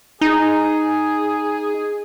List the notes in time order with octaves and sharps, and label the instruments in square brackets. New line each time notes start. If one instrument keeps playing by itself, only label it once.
[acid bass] D#4 [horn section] G#4